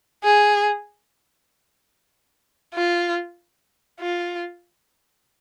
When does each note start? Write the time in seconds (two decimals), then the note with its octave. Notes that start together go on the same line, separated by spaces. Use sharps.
0.24 G#4
2.74 F4
4.00 F4